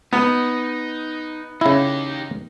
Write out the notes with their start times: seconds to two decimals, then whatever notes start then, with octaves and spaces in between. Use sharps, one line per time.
0.13 B3 D#4
1.61 C#3 D#4 E4 G4